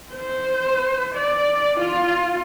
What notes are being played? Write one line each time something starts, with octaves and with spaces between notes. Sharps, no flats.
C5
D5
F4